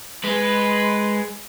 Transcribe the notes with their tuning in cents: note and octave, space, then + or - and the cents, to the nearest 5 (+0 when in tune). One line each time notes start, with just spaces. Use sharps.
G#3 +0 B4 +0